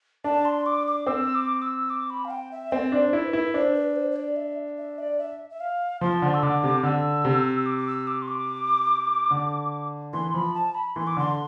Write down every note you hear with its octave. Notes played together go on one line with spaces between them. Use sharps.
D4 A5
C6
D6
D6
C4 E6
D6
E6
D6
B5
F5
G5
E5
C4 D5
D4
C5
E4
B4
E4
B4
D4 C5
B4
C5
C5
D5
E5
E5
D5
E5
E5
F5
F3 C6
D3
E6
D3 D6
C3
D3 E6
C3
E6
D6
D6
E6
D6
C6
D6
D3
E3 C6
F3 B5
A5
B5
E3 C6
D6
D3 C6